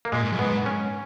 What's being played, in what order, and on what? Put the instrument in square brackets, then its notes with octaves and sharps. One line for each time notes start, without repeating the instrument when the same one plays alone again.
[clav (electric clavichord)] A#3
[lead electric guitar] A#2 [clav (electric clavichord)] G#3
[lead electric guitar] G#2
F#2
[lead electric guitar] G#2 [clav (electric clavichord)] B3
[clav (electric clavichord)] C#4